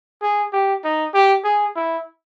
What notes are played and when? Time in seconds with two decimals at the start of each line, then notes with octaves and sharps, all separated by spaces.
0.22 G#4
0.53 G4
0.84 D#4
1.14 G4
1.44 G#4
1.76 E4